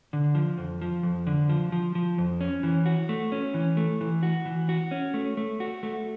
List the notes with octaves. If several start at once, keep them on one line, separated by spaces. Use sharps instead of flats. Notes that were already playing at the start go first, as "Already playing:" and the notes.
D3
F3
F2
F3
F2
D3
F3
F3
F3
F2
C#4
E3
F#4
A3
C#4
E3
A3
E3
F#4
E3
F#4
C#4
A3
A3
F#4
A3